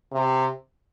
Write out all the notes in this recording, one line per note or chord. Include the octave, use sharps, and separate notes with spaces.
C3